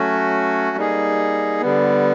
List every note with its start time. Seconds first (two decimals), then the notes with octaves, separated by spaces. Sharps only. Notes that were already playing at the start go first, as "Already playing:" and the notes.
Already playing: F#3 A3 C#4 F#4
0.77 G3 A#3 D#4 G#4
1.62 D3 G3 B3